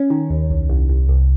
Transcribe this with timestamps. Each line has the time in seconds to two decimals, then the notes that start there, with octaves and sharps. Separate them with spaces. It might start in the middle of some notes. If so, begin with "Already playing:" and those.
Already playing: C#4
0.10 D#3
0.30 D#2
0.50 C2
0.69 C2
0.89 C2
1.09 C2